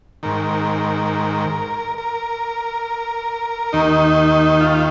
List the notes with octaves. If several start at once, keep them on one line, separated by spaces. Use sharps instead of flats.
G#2 D#3 A#4
A#4
D#2 D#3 D#4
F4